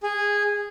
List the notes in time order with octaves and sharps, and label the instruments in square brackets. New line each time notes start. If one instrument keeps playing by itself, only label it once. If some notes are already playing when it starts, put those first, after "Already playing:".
[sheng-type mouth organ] G#4